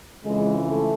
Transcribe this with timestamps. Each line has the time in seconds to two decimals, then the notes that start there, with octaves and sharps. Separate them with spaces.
0.25 F2 C#3 E3 G#3
0.66 A3